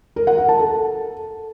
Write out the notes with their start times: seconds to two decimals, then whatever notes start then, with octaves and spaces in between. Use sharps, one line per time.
0.16 A#4
0.27 F#5
0.38 A#4
0.49 A5
0.59 A4